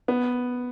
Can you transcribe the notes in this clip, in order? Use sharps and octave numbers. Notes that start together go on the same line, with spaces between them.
B3